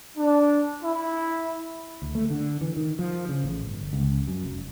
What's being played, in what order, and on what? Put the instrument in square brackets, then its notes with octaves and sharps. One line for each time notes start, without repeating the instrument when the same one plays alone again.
[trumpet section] D4
E4
[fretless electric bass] D2
A3
D3
E3
D#3
F3
C#3
A1
G1
C#2
F#2
F1